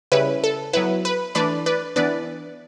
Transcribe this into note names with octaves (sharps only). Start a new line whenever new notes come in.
C#3 G3 C#4 E4 B4
A4
F#3 B3 E4 B4
B4
E3 A3 D4 B4 D5
B4 D5
E3 B3 D4 B4 D5